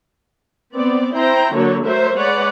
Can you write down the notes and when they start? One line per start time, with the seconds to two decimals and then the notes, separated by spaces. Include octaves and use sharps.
0.74 B3 C4 D5
1.15 C4 E4 C5 G5 A#5
1.55 D3 F#3 A#3 A4 C#5
1.83 F#3 A3 A#4 C5 E5
2.18 G#3 B4 C#5 D5 F#5